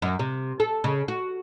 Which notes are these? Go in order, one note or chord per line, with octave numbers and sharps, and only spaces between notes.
F#2
C3
A4
C#3
F#4